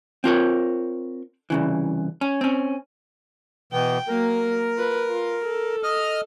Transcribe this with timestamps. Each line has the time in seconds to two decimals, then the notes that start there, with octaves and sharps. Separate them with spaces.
0.24 C4 F4 A#4 C#5
1.50 C2 C#3 E3
2.21 C#4
2.41 C4 C#4
3.73 B2 E3 B3 G5
4.08 F#3 A#3 A#4
4.76 F4 B4
5.07 F4
5.46 A4
5.83 D#5 F6